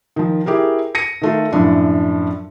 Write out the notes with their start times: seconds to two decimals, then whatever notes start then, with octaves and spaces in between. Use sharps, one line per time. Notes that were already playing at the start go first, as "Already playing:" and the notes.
0.16 D#3 F3
0.46 E4 G4 G#4 A#4
0.95 A#6 C#7 D#7
1.22 D#3 A3 F4
1.52 F#2 A2 F3 D4